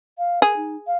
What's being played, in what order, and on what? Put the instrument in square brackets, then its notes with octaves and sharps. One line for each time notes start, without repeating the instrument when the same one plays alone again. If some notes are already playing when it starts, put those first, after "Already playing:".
[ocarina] F5
[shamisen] G#4 [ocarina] A#4
[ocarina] D#4
F5